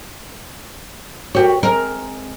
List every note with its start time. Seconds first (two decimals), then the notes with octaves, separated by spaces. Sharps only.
1.35 F#4 G4 A4 A#4 C#5
1.63 G#3 C4 A#4